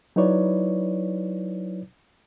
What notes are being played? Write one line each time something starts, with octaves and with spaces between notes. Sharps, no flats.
F#3 D#4 E4 B4 C#5 D5